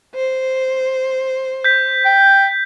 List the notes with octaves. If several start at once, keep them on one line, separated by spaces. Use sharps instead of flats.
C5
G6 B6
G5